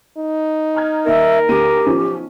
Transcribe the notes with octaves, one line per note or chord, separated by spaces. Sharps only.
D#4
A#5 F6 G#6
D#2 A#4 E5
D2 G4 D#7
B1 F3 C#4